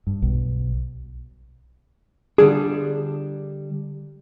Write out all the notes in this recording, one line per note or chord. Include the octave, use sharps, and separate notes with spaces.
G2
B1
D3 G3 D4 G#4